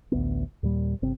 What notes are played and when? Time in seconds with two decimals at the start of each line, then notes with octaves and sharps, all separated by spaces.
0.12 A1 D2 E3 B3
0.63 D#2 A#2 G3
1.02 G1 C3 C4